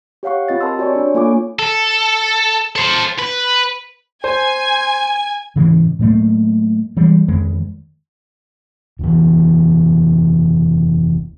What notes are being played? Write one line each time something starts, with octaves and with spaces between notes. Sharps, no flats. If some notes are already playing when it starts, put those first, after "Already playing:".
G4 C#5 F5 F#5 C#6
C4 F4 D#5 A6
G4 A#4 A5 B5 C6 E6
F#4 C#5 D5 G#5 C#6
D4 C#5
A#3 F4 A4 G#5 C#6 D6
A4
A4 C5
B4
C5 G#5 G#6
G#2 C#3 E3 G#3
A2 F#3 A3 A#3
E3 G3 G#3
F2 D#3 G#3
F1 D#2 A2 E3